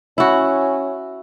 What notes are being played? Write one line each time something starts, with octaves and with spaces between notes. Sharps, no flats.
C#4 E4 F#4